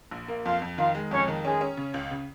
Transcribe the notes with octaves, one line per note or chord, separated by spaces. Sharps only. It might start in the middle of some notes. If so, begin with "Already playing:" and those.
A#1
A#3
F2 F4 F5
F2
D#3 F4 F5
G#3
F2 C#4 C#5
D#3
G#3 C#4 G#4
C#4
C#3
C#2
C#3